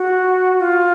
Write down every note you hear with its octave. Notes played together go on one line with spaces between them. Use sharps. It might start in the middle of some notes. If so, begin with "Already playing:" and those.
Already playing: F#4
F4